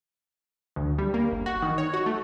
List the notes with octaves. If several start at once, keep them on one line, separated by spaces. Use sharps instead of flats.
D2
G3
A#3
G1
F#4
D#3
C#5
F#4
A3